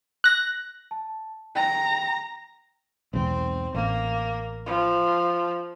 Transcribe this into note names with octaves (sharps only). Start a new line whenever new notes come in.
F#6 A#6
A5
G5 A#5
B1 E2 G#2 C4
A1 A#3
F3